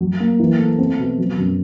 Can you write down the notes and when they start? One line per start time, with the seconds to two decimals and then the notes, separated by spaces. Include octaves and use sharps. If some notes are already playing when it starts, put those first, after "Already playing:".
0.01 F#3
0.20 A#3
0.40 E3
0.59 A3
0.78 C4
0.99 B2
1.18 F#3
1.38 F#2